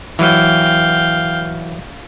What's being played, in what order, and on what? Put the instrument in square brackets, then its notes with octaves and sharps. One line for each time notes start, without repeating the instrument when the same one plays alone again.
[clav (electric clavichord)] E3 F#3 [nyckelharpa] F5 G5